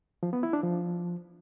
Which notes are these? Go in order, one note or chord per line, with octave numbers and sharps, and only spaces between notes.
F3
B3
E4
D4
F3